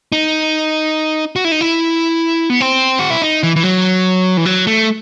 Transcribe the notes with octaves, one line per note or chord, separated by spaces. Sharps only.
D#4
F#4
E4
D#4
E4
B3
C4
F#4
E4
D#4
E3
E3
F#3
E3
F#3
A3